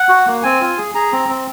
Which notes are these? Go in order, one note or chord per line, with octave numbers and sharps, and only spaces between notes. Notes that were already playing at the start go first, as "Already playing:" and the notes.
Already playing: F#5
F#4
A#3
C4 G#5
F4
G#4
G#4 A#5
C4
C4